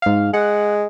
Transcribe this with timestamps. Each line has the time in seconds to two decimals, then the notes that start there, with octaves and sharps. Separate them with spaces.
0.02 G#2 F5
0.34 G#3 F#5